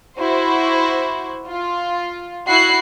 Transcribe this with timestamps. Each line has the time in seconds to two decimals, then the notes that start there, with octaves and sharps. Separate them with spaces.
0.16 E4 F#4 C5
1.48 F4
2.48 E4 F#4 F#6 C7